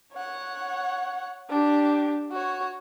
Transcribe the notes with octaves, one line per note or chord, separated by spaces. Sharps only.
C#5 F#5
D4 G4
F#4 C#5